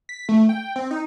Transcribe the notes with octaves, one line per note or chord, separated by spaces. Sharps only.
B6
A3
G5
C4
D#4